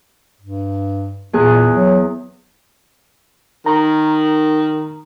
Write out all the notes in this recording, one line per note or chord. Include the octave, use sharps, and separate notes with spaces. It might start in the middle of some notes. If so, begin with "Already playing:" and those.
G2
E2 A#2 G#4 F#6
F#3
D#3 A#5